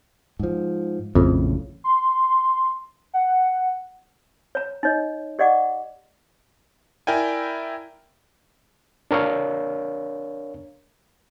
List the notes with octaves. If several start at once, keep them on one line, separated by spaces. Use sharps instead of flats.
G#2 F3
A#1 F2 A2 C#3
C6
F#5
C#5 A#5
D#4 C#5 D#5
G4 D5 D#5 F#5 D6
E4 A#4 D5 G5 G#5
D4 A#4 C#5 F5